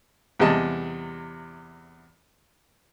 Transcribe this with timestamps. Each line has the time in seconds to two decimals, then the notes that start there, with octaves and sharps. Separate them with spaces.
0.40 E2 C3 G3 G#4 D#5 A5